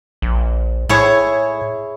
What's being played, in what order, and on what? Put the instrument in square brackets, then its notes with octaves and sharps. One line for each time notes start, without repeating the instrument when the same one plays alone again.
[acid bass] A#1
[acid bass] A2 [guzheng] E4 G#4 C#5